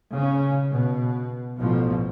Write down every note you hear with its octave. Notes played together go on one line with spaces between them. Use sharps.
C#3 C#4
B2
A1 B2 F3